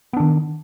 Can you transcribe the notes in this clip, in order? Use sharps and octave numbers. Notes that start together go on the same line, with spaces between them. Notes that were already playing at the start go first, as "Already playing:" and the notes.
D#3 B3 D4